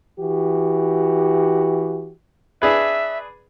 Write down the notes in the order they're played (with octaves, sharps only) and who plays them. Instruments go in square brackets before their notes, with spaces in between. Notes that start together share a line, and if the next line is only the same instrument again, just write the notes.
[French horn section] E3 F#4 G4
[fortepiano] D4 G#4 B4 [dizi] E5